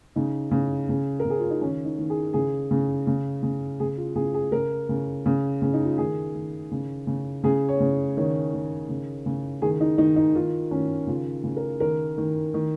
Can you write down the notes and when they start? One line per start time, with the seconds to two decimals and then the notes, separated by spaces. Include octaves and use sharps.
0.16 C#3 D#4
0.51 C#3
0.89 C#3
1.20 A#4
1.25 C#3
1.30 G#4
1.40 F4
1.51 D#4
1.61 D#3 C#4
1.85 D#4
1.98 D#3
2.10 G#4
2.33 C#3 G#4
2.71 C#3
3.07 C#3
3.43 C#3
3.80 C#3 G#4
3.98 F4
4.15 C#3 G#4
4.34 G#4
4.52 C#3 A#4
4.89 C#3
5.26 C#3
5.62 C#3
5.74 D#4
5.85 F4
5.98 D#3 G#4
6.34 D#3
6.72 C#3
7.07 C#3
7.44 C#3 G#4
7.69 C#5
7.80 C#3
8.17 D#3 C#5
8.53 D#3
8.89 C#3
9.26 C#3
9.62 D#3 G#4
9.81 D#4
9.98 D#3 D#4
10.16 D#4
10.35 D#3 F4
10.71 D#3 C#4
11.07 C#3 F4
11.44 C#3
11.57 A#4
11.80 D#3 A#4
12.18 D#3
12.54 D#3